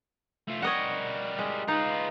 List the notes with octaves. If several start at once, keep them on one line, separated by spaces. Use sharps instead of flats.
A3 F4
G3 A#4 C#5 D#5 F#5
G#3
D#4 F4 B4